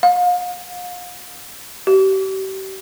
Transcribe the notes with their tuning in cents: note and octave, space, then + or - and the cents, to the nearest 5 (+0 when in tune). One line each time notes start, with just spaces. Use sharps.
F5 +40
G4 -40